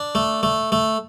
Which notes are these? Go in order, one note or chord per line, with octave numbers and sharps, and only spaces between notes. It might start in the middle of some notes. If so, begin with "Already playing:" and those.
Already playing: D4
A3
A3
A3